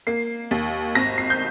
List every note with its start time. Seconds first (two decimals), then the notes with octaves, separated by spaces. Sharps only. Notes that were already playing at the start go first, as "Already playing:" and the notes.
0.07 A#3 C7
0.51 D#2
0.95 G#1 A#6
1.18 C7
1.30 G6